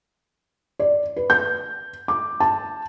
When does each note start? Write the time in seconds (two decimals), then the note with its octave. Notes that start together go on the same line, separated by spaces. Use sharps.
0.79 D5
1.16 B4
1.30 G6
2.08 D6
2.40 A5